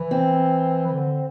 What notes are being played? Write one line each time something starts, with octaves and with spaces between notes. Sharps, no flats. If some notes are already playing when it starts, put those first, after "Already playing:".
Already playing: E3
C4
E3
D3